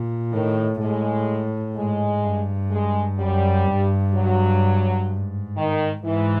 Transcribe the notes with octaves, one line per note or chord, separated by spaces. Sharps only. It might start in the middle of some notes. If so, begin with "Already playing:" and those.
Already playing: A#2
A2 D#3
A2 G#3
G#2 G#3
G2
G#3
F#2 G3
G2
F#3
G#2
D#3
G#2 E3